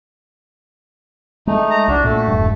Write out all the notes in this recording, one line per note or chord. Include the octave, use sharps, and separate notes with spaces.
G#3 A3 D#4
A#5
C2 D4 F#4
A#2 A3
E1 G2